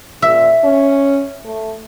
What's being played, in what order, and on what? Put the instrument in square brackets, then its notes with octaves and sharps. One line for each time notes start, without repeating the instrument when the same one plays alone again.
[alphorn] A#2 [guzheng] E5
[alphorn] C#4
A3